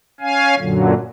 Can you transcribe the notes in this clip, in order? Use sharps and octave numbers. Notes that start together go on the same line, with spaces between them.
C#4 F5 G#5
F#2 A#2 D3 F#3